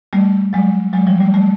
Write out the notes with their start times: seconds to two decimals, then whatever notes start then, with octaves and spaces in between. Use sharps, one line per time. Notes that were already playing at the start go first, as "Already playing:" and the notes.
0.13 G3 A3
0.53 F#3 G#3
0.93 F#3 G#3
1.07 F3 G3
1.20 G3 A3
1.34 G3 A3